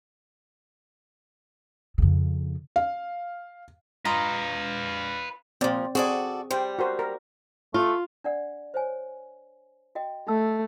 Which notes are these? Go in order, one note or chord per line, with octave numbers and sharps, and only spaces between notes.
F2 C#3
F5
F4 B4 D#5 F5 A#5
A#2 F3 C4 D5
C4 F#4 G#4 A4 D5
G3 C5 G5
F#4 A#4 C5
A#4
A3 F4
D4 D5 F#5
C5 C#5 G#5
F#4 D#5 G5
A3 A5 E6